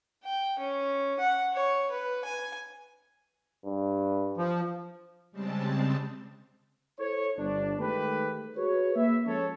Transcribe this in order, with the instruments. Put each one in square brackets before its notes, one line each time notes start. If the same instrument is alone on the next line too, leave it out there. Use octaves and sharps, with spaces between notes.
[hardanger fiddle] G5
C#4
F#5
C#5
B4
G#5
[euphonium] G2
[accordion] F3
[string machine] C#3 G3 G#3 C4 A5
[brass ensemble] E4 A4 C5 C#5
G1 D4
D#3 G#3 A3 G4 B4
F#4 G#4 B4 C#5
A#3 B4 E5
F3 G#3 C#4 A4 C#5